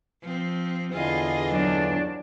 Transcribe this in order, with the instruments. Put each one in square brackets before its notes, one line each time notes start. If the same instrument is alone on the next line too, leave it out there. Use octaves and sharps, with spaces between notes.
[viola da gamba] F3 C4
[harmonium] E2 D3 E3 [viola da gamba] F4 G#4 D#5
[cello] F#3 D4